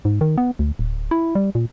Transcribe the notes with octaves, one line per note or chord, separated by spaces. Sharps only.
G#2
D#3
B3
D2
D1
E4
G3
A#2